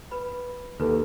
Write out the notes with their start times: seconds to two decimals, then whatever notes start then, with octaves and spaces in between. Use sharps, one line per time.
0.11 B4 B5
0.80 D#2 A4 B4